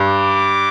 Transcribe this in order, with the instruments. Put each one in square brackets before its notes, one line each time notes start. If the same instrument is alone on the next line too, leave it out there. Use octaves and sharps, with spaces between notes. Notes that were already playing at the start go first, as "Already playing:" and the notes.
Already playing: [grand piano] G2
[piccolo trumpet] D6